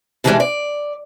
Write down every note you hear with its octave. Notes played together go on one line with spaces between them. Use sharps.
B2 D3 E3 G3 G#3 D4
D5